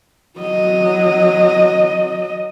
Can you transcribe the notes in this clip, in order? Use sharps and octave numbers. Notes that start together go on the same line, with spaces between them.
F#3 D#5